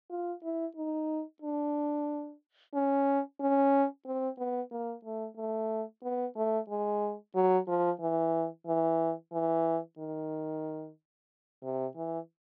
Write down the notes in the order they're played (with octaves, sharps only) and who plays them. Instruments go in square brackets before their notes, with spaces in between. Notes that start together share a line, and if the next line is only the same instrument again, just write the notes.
[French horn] F4
E4
D#4
D4
C#4
C#4
C4
B3
A#3
A3
A3
B3
A3
G#3
F#3
F3
E3
E3
E3
D#3
C3
E3